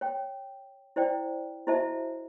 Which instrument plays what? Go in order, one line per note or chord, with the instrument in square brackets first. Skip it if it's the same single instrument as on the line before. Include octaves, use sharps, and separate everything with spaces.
[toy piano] C#5 G5
E4 C5 D5 G5
E4 F#4 C5 D#5 E5 A5